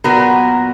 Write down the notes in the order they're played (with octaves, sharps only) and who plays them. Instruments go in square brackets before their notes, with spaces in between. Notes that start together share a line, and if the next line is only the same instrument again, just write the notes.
[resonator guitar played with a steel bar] A#2 F#3 B3 F#4 A#4